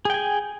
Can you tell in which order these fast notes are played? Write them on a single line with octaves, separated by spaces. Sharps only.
G#4 G5 G#5